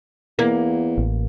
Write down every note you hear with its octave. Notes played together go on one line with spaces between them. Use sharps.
E2 A#3
A1